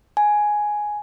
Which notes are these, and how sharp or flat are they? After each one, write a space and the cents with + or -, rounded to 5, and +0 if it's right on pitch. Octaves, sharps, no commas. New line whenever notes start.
G#5 +5